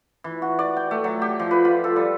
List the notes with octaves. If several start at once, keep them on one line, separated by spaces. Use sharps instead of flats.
E3
F#4
D5
G5
A3
F#3
G4
F3
B4
F4
A4
G3